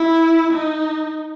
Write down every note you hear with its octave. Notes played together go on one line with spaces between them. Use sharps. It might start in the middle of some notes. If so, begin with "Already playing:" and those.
Already playing: E4
D#4